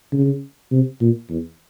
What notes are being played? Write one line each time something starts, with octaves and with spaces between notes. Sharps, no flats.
C#3
C3
A#2
E2